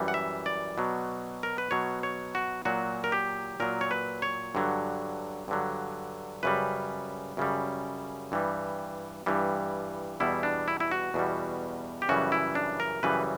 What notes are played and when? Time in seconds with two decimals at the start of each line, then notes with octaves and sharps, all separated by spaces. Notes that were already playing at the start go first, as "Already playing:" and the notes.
Already playing: F#2 E3 G3
0.08 F#5
0.14 E5
0.46 D5
0.78 B2 F#3
1.43 A#4
1.58 B4
1.71 B2 F#3 C#5
2.03 C#5
2.35 F#4
2.65 A#2 F#3 F#4
3.04 A#4
3.12 G4
3.60 A#2 F#3 A#4
3.81 C#5
3.91 B4
4.22 C#5
4.55 G2 D3 F#3
5.48 G2 D3 F#3
6.43 F#2 C#3 G3 B4
7.37 F#2 C#3 G3
8.32 G2 E3 G3
9.26 G2 E3 G3
10.20 E2 B2 G3 E4
10.43 D4
10.68 E4
10.80 E4
10.92 F#4
11.14 E2 B2 G3
12.02 G4
12.09 F#2 C#3 E3 G3 F#4
12.32 E4
12.55 D4
12.80 A#4
13.03 F#2 C#3 E3 G3 B4